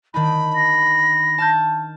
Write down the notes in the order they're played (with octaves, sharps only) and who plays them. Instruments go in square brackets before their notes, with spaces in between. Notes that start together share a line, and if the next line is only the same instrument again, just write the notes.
[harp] D#3 D4 D#4 [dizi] B5
[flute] A#6
[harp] A5 F6 G6